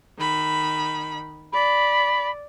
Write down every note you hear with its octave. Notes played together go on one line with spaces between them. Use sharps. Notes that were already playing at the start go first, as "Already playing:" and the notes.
D#3 B5
D5 B5